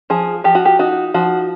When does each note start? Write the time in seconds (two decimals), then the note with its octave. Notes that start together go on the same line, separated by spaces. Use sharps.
0.10 F3 G#4
0.44 F3 G4
0.55 F#4
0.65 G4
0.79 D#4 F#4
1.14 F3 F#4